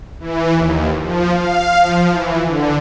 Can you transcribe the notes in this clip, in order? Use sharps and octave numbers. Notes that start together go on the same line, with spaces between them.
E3
D#2
F3
F5
F3
E3
D3